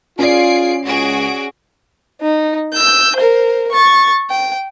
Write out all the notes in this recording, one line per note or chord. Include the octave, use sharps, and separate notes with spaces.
C#4 F4 G#4 D5 C7 D7
C#2 F#4 G#4 D7
D#4
E6 G6
A#4 C5
C#6 A6
G5